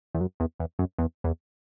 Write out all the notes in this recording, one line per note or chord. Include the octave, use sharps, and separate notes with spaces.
E2
F#2
E2
E2
F#2
E2
E2